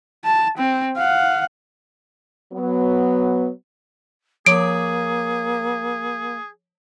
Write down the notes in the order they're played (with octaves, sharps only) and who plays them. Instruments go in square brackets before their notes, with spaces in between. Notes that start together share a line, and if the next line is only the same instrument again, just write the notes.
[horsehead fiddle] A5
C4
F5 F#5
[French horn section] F#3 B3
[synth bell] F3 C#5 D6 [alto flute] A#3 [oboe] G#4 [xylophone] D7